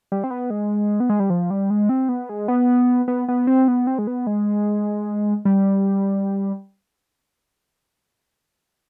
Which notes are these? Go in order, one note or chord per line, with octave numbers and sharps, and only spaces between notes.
G3
C4
B3
G#3
B3
G#3
G3
F3
G3
G#3
C4
B3
G#3
B3
B3
B3
C4
B3
C4
G#3
B3
G#3
G3